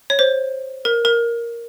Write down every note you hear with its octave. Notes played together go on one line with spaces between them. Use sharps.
C#5
C5
A#4
A#4